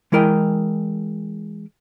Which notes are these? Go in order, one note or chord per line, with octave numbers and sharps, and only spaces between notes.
E3 G#3 E4 A#4 D#5 G5